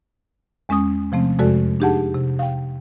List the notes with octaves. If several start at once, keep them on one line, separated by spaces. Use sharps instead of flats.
E2 G#3 C#4 G#5 D#6
C3 F3 A3 C4
F2 C3 G#3 F#4 A4 D5
D4 D#4 G4 G#4 F#5 A5
C3
F5 G5